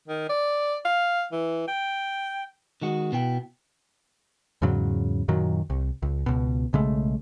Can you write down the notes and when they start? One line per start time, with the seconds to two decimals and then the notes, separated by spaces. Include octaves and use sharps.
0.08 D#3
0.29 D5
0.85 F5
1.32 E3
1.68 G5
2.82 D#3 G#3 F#4
3.12 B2 B3 E4 G5
4.62 E2 G#2 C#3 F#3
5.28 F#2 A#2 D#3 F#3
5.70 C2
6.02 C#2
6.26 C#2 B2
6.73 B1 C#3 G#3 A3